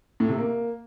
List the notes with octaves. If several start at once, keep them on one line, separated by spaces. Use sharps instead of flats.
A2
C3
A#3